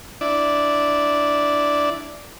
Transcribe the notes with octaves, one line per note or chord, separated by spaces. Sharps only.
D4 E4 D5